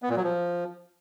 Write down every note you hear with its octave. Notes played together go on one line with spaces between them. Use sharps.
B3
A#2
F#3
F3